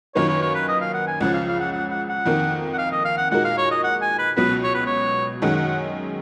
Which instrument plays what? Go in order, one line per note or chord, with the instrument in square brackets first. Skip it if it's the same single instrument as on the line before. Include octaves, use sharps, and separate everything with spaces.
[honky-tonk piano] F#2 D#3 A#3 F4 B4 [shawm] C#5
[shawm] C#5
C#5
B4
D#5
F5
F#5
G#5
[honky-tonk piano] C#2 C#3 F3 [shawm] F#5
[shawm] F5
F5
F#5
F#5
F#5
F#5
[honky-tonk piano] F2 D#3 A#3
[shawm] F#5
F5
D#5
F5
F#5
[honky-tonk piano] A#2 G#3 D#4 F#4 A#4 [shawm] F#5
[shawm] F5
C#5
D#5
F#5
G#5
B4
[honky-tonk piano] C#2 B2 F#3 B3 F#4 [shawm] B4
[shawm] C#5
B4
C#5
[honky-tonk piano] F#2 D#3 G#3 C#4 [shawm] F#5
[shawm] F#5
F#5